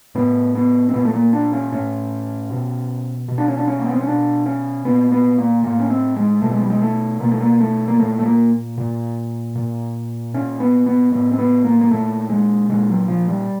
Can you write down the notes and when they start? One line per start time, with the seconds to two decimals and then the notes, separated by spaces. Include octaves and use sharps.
0.15 A2 B3
0.55 B3
0.89 C4
0.94 A#2 B3
1.05 A3
1.13 A#3
1.33 D4
1.53 C#4
1.72 A2 C#4
2.51 B2
3.28 B2
3.38 D4
3.48 C#4
3.57 D4
3.68 C#4
3.79 A#3
3.86 B3
3.93 C4
4.01 C#4
4.07 B2 D4
4.46 C#4
4.85 A#2 B3
5.12 B3
5.38 A#3
5.63 A2 A#3
5.80 C#4
5.90 C4
6.16 G#3
6.42 B2 A3
6.51 G#3
6.61 G3
6.70 G#3
6.82 A3
7.20 B2 A#3
7.31 A3
7.41 A#3
7.60 A3
7.88 A#3
7.99 A#2 A3
8.19 A3
8.26 A#3
8.78 A#2
9.55 A#2
10.34 A#2 C#4
10.60 B3
10.86 B3
11.12 A2 B3
11.31 C4
11.39 B3
11.64 A#3
11.81 A#3
11.91 A#2 A3
12.30 G#3
12.69 A#2 G#3
12.89 F#3
13.08 F3
13.28 G3